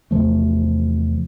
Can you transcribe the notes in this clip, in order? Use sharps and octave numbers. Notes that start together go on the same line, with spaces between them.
E2 C3 F3 A3